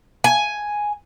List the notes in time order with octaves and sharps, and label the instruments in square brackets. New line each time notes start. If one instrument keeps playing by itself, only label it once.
[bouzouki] G#5